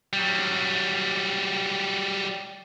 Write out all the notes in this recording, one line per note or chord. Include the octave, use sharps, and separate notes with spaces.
F#3 G3